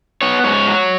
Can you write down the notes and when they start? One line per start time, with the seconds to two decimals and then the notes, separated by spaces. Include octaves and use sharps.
0.22 B3 C#5
0.44 G#2 C#5
0.67 F#3